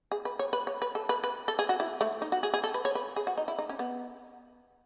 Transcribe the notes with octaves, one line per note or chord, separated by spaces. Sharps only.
G#4
B4
C#5
B4
C#5
B4
A4
B4
B4
A4
G#4
F#4
E4
A3
D#4
F#4
G#4
G#4
A4
B4
C#5
B4
G#4
F#4
D#4
E4
D#4
C#4
B3